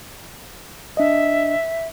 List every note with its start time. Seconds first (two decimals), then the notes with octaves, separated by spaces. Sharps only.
0.97 D4 D#5 E5